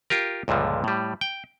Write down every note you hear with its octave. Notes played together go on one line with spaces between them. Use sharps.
F4 G4 A#4
C#2 G2 A#2 D3 F3
A2 G3
G5